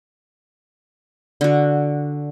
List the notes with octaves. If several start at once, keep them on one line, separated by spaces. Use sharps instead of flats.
D3 F#4